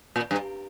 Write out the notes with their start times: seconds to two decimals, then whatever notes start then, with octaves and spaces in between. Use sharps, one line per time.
0.16 A#2
0.31 G2